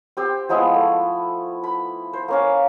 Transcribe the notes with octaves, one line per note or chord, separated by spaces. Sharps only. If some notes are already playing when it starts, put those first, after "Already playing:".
C4 G4 C5
F3 G#3 B3 E4
A3
B5
C5
A#3 C#4 F5